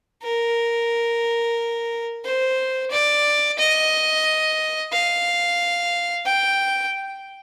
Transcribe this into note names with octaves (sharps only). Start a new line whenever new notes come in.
A#4
C5
D5
D#5
F5
G5